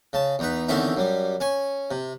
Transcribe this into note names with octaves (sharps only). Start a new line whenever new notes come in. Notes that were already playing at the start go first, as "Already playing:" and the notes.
C#3 A5
E2 D#4 B4
E2 D3 D#3 C4 C#4 E5
F#2 G3
C#4 G#5 C#6
C3